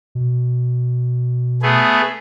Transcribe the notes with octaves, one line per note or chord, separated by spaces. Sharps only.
B2
A3 B3 G#4